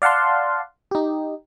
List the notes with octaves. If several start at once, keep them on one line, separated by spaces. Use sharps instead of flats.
D5 F5 F#5 A5 C6
D#4 G4